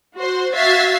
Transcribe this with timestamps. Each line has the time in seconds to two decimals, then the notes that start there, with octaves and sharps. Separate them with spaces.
0.16 F#4 C5
0.55 F#4 E5 F5 G#6 A6 C7